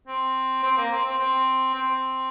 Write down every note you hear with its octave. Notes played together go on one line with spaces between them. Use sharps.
C4
C4
A#3
C4
C4
C4
C4